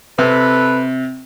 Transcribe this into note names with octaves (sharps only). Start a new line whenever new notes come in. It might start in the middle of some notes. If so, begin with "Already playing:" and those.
C3 A4 B4